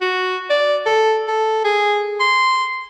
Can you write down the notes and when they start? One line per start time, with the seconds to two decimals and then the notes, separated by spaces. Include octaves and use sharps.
0.01 F#4
0.50 D5
0.86 A4
1.28 A4
1.65 G#4
2.20 C6